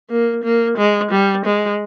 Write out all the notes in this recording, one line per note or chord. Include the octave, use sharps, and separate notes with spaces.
A#3
A#3
G#3
G3
G#3